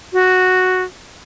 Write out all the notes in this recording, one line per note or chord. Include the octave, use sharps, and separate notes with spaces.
F#4